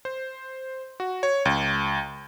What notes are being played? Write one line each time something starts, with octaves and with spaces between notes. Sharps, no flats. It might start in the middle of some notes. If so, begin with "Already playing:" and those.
C5
F#4
C#5
C#2